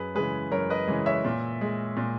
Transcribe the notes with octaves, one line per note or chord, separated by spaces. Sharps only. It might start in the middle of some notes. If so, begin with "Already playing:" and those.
Already playing: F#2 G#4 B4
C#3 E3 G#3 G#4 B4
F#2 A#4 C#5
B4 D#5
C#3 E3 G#3
C#5 E5
A#2
G#3
A#2